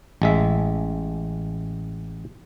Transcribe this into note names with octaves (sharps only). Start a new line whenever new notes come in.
A1 G#3 E5